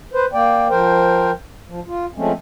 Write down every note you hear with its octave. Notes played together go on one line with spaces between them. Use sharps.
B4 C5
A#3 D5 G5
F3 A#4 C5 G5
F3
F4
F3 G#3 A3 C4 C#4